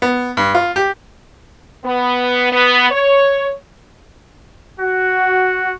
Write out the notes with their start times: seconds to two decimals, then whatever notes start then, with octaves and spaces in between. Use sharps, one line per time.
0.02 B3
0.37 G2
0.55 F4
0.76 G4
1.85 B3
2.52 B3
2.91 C#5
4.80 F#4